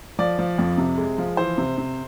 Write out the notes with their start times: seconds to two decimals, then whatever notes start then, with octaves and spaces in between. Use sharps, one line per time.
0.19 F3 D5
0.39 F3
0.59 F2
0.78 C3
0.98 G#3
1.18 F3
1.37 E3 C5
1.58 C3
1.78 C3